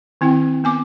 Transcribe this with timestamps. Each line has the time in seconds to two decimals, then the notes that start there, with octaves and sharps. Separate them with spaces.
0.21 D#3 C4 E4 G5
0.64 B3 G#5 D6